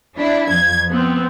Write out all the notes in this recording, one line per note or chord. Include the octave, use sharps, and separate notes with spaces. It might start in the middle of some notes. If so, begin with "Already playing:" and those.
D4 E4
F2 G#6
B3 C4